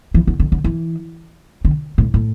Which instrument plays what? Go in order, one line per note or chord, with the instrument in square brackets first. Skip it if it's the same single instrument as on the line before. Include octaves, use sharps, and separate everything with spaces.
[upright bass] E3
D3
D3
D3
E3
D3
A2
A2